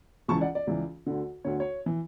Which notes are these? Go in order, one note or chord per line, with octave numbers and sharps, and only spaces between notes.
C#2 C#3 E3 A5 C#6
D5 F#5
D5
C#2 C#3 E3
D2 D3
D2 D3 C#5
C#5
E3